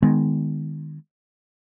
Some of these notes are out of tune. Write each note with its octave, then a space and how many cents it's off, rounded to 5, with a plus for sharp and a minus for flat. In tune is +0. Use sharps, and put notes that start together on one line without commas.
D#3 -15 G#3 -10 B3 +15